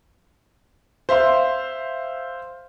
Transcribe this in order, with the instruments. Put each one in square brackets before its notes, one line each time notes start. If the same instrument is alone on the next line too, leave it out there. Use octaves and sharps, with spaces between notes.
[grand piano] C5 E5 F5 C6